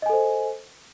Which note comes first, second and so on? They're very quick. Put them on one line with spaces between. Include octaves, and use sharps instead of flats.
D#5 G#5 A4 C5